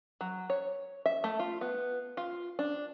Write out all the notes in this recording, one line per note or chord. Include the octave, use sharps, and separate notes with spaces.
F#3
C#5
E5
A3
F4
B3
F4
D4